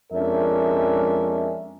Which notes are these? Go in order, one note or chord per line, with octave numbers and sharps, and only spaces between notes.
F2 G#3 C#4 D4 A#4 E5